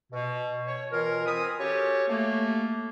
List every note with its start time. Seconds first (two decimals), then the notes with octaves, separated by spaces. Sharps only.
0.12 B2
0.67 C#5
0.92 B2 E3 F4 A#4
1.26 C4 A#4 G#5 B5 D#6
1.59 C#4 F#4 G4 A4 C#5
2.09 A3 A#3